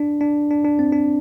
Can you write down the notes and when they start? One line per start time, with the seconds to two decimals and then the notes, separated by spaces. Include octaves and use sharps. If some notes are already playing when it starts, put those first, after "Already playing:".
Already playing: D4
0.21 D4
0.51 D4
0.64 D4
0.79 C4
0.93 D4